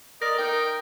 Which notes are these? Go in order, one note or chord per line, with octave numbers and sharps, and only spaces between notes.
A#4 D5 D#5 A#6
D#4 A#4 G5